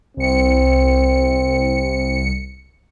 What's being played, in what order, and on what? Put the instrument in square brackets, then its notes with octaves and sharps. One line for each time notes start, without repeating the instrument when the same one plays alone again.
[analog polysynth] C2 C#7 [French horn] C4